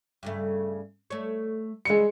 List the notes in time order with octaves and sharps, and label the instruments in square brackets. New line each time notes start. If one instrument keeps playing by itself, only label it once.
[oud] G2 C#3 A3
A3 C#5
[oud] C#3 E3 G3 [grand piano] G#3 C#7